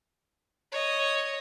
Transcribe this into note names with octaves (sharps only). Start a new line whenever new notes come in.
C#5 D#5